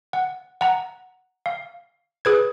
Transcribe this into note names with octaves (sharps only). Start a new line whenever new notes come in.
F#5
F#5 A#5
F5
G#4 B4 G#6